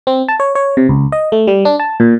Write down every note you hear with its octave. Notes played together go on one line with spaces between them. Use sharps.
C4
A5
C#5
C#5
C3
C#2
D#5
A3
G3
D4
A5
A#2